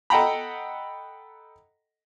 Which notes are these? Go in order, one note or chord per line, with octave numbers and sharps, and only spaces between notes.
A4 D#5 F#5 G5 A#5 B5